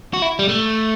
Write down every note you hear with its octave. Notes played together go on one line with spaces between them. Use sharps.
F#4
E4
G3
A3